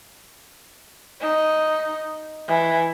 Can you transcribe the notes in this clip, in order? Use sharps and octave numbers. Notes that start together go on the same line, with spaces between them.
D#4
E3